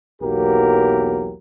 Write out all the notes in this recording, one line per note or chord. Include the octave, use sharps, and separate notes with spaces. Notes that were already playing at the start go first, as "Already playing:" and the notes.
B1 E2 F#3 A#3 G4 A#4